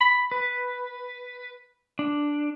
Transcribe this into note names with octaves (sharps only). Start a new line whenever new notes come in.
B5
B4
D4